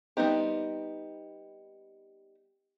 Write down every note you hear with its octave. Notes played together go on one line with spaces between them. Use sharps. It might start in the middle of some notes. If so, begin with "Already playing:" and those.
G3 B3 C4 D#4 G4